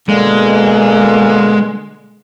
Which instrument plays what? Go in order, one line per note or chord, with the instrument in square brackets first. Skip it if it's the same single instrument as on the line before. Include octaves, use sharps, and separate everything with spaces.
[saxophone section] B2 D3 A#3 [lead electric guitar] G#3